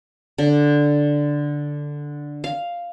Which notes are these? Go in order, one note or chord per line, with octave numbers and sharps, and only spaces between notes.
D3
F5